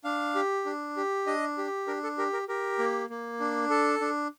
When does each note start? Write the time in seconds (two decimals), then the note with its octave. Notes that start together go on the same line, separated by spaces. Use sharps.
0.04 D4 F5
0.35 G4
0.65 D4
0.96 G4
1.27 D4 D#5
1.58 G4
1.87 D4 A#4
2.03 A4
2.18 G4 A#4
2.33 A#4
2.48 G4 A#4
2.79 A#3
3.10 A#3
3.40 D4
3.70 A4
4.01 D4